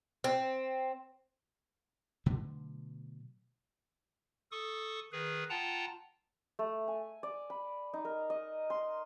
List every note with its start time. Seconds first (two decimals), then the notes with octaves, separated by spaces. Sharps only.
0.24 C4
2.26 B2 D3 F#3 A3
4.52 A4 C#6 D#6
5.12 D#3 G#4 B4
5.50 F4 F#5 G5 A5 A#5
6.59 A3
6.88 G#5
7.23 D5
7.50 B5
7.93 D#4
8.05 A#4
8.30 D#5
8.70 C6